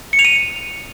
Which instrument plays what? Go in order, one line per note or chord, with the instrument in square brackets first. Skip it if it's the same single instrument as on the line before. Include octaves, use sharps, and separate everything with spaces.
[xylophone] C#7
F7
D#7